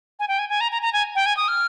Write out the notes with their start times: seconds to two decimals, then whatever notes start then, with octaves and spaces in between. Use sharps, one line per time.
0.20 G#5
0.28 G5
0.39 G#5
0.49 G#5
0.61 A#5
0.72 A#5
0.82 A#5
0.93 G#5
1.15 G5
1.26 G#5
1.37 D#6
1.48 F6